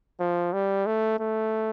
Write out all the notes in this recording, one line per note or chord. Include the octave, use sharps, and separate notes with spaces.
F3
G3
A3
A3